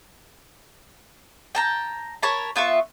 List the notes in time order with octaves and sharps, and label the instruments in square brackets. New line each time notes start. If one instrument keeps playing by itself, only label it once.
[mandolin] G5 A5 A#5
A#4 C#5 A5 B5
B3 F4 E5 C#6